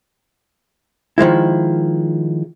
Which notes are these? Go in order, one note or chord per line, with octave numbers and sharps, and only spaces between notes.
D#3 F3 G#3 E4